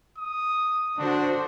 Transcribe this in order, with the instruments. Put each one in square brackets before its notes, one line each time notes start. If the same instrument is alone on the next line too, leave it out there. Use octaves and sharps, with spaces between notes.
[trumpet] D#6
[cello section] D3 F#4 C5 [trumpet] D4